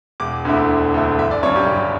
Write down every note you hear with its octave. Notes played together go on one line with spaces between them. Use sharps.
E1 D6
D2 D3 A3 E4
E1
D2 D3 A3 E4
G1 E5
D5
F#2 C#3 C#5
G4
G1